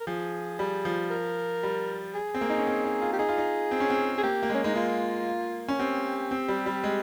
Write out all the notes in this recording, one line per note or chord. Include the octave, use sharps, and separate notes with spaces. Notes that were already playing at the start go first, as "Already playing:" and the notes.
A#4
F3 G#4
G3
F3
A#4
G3
G#4
C4
A#3
D#4
C#4
C4
D#4
F4
G4
D#4 G#4
F4
D#4
C4
C#4
C4
G#4
A#3 G4
A#3
G#3 C#4
G#3 D#4
A#3 F4
C#4
C4 G4
C4
G3
G3
G#3